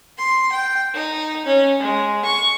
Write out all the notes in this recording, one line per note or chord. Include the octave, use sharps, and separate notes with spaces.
C6
G5
D#4
C#4
G#3
C#6